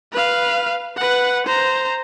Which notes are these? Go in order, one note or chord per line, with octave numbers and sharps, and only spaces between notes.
B4 F5
B4 F#5
C5 A#5